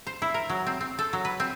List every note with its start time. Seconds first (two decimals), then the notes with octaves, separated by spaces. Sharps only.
0.07 C5
0.22 E4
0.34 A#4
0.50 F#3
0.67 C4
0.81 C4
0.99 A4
1.13 F#3
1.25 B4
1.40 C4